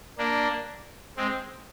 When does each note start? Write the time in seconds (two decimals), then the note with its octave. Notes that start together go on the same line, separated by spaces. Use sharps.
0.18 A#3 D4
1.17 G#3 C4